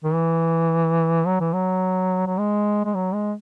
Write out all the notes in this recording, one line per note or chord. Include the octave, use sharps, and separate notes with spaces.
D#3
E3
F#3
E3
F#3
F#3
G#3
G#3
F#3
G#3